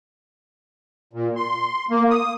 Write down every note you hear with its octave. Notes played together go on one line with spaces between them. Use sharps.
A#2
C6
A#3
D#6